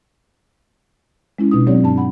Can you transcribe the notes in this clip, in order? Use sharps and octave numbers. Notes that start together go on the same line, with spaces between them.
G#3 C#4 E4
B2 D4 D#4 D#6
F#3 C4 G4 C#5 D5
G2 D4 A5
F#5 B5